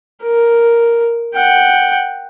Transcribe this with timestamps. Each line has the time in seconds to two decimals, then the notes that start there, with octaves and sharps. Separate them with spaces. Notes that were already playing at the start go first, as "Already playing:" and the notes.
0.23 A#4
1.35 F#5 G5